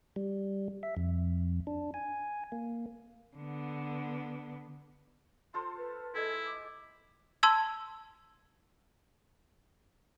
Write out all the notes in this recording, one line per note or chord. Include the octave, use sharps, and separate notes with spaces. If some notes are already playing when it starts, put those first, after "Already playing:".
G3
E5
F2
D4
G#5
A#3
D3 B3
F4 A4 C5 C6
B4
G#3 E4 A4 G#5
D6
A5 C6 E6 G#6